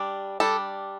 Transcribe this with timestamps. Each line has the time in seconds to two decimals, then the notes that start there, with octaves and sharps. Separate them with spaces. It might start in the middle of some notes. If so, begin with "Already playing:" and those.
Already playing: G3 D4
0.40 G3 D4 A4